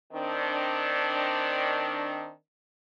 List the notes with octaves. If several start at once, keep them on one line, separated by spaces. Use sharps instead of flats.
D#3 C4 D4